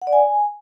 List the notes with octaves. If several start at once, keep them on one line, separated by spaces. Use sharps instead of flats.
F#5
D5
G#5